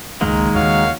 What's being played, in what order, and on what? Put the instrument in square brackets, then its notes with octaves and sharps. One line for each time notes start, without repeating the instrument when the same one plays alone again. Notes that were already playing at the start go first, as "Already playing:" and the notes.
[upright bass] F#1 C#2 [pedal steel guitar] D#3 G#3 A#3
[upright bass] D#2 C#3 [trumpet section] F#4 C#5 F5